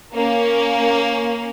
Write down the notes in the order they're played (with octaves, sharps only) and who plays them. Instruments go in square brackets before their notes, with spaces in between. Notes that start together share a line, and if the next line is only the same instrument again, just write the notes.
[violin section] A#3 C#4